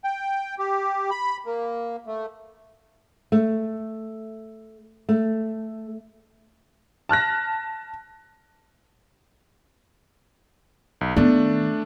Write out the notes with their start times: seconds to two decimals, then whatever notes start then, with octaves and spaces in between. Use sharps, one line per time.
0.04 G5
0.59 G4
1.11 B5
1.46 A#3
2.07 A3
3.32 A3
5.09 A3
7.09 A5 F6 F#6 A#6
11.01 B1
11.17 D#3 A3 B3 D4